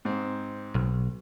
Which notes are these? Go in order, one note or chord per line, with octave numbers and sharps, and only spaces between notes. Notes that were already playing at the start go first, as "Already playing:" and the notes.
G#2 C4
B1